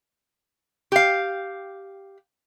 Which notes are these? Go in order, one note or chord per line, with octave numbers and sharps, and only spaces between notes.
G4 F5